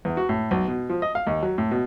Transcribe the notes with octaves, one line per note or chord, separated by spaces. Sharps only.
E2
F#4
A2
B1
B2
F3
D#5
F5
D#2
F#3
A2
B2